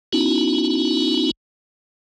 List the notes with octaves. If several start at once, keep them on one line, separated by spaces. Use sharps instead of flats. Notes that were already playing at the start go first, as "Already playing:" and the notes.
B3 C#4 D#4 E4 F#4